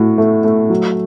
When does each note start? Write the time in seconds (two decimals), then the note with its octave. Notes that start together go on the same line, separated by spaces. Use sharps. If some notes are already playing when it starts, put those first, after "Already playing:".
Already playing: A2 F#4
0.18 A3
0.44 A3
0.70 F#3